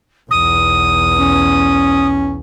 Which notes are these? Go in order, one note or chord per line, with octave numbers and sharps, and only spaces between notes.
B1 E2 D#6
C#4